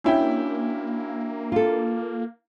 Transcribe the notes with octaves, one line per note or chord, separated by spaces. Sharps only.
A#3 C#4 D4 E4 F#4 G5
F4 A4